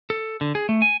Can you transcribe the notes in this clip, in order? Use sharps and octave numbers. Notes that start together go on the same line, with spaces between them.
A4
D3
G#4
A3
G#5